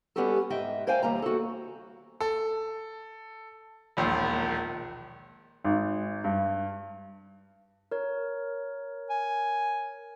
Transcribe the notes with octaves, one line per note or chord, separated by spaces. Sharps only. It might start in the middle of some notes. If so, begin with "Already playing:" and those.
G3 B3 C#4 F#4 G4 A4
G#2 D#5 E5 G5
A#4 C5 D5 F5 G5 G#5
D#2 G3 A#3 A#5
F#4 A4
A4
E1 A#1 D#2
G#1
G2
A#4 C#5
G#5